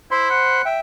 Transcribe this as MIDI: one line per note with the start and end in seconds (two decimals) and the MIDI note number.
0.11 0.28 64
0.11 0.62 72
0.11 0.62 83
0.11 0.62 84
0.30 0.63 78
0.65 0.80 76
0.65 0.80 79